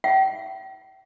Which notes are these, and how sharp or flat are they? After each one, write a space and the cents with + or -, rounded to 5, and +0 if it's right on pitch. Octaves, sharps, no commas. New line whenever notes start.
E5 +40 G5 -40